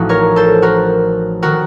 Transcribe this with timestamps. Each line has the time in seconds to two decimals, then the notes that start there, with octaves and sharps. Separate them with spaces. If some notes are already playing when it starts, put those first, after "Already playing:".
Already playing: A1 A2 F3 D#4 F#4
0.09 A#4 C#5
0.36 A4 C5
0.62 F#4 A#4
1.42 D#3 F#4 A#4